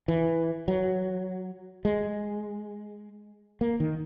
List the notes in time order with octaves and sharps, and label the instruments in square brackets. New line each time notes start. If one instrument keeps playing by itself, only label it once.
[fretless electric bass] E3
F#3
G#3
A#3
D#3